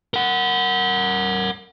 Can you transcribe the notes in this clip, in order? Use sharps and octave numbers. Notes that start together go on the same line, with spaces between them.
A#4 F#5